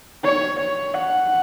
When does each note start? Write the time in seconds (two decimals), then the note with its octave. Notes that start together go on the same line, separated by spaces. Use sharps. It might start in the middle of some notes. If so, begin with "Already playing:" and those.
0.24 C#5
0.59 C#5
0.94 F#5